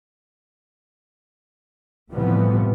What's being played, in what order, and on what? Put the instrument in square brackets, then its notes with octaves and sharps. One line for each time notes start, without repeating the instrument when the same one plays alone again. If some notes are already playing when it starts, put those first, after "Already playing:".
[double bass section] A2 C3 E3 F3 G3 B3